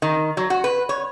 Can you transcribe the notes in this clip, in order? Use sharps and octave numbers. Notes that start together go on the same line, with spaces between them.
D#3
F#3
F#4
B4
C#5